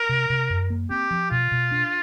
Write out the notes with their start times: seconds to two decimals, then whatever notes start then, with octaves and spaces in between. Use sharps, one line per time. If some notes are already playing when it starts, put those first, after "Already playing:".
Already playing: A#4
0.09 C3
0.30 C3
0.50 F#2
0.70 A#3
0.90 C4 G4
1.11 F3
1.31 B2 F4
1.52 B2
1.72 D4